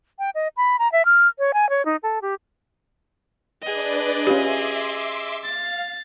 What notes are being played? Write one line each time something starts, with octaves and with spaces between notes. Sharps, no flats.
G5
D#5
B5
A#5
E5
F6
C#5
G#5
C#5
D#4
A4
G4
D4 G#4 B4 D5 D#5
C#4 F4 G4 B4 E5 C6 D6
F5 A6